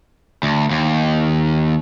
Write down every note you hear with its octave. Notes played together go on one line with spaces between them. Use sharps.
D2
D#2